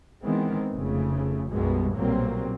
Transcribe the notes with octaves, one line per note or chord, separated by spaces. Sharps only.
D#3 E3 G#3 B3 C4
F1 C#3 A3
B1 F#2 B2 G3 G#3 B3
B1 A#2 F#3 G3 A#3 C4